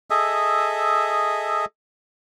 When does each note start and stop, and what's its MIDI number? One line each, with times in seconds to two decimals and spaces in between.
0.10 1.65 68
0.10 1.65 69
0.10 1.65 75
0.10 1.65 76